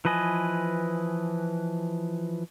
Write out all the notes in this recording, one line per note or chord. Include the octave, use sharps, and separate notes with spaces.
E3 F3 B4 D#5 G#5